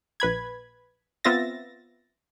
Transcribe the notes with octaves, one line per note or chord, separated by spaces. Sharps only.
A#1 B4 B5 G#6
B3 C4 F4 E5 A6 A#6